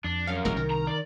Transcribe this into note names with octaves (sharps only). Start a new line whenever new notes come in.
F2 D4
F#2 F5
E1 A1 G#3 A#4
C2 D#3
A#5
D5